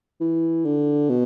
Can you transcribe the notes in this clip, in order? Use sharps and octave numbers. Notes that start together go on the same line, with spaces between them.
E3
D3
B2